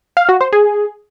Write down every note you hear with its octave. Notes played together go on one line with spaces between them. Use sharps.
F5
F#4
C5
G#4